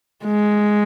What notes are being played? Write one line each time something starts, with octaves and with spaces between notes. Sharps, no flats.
G#3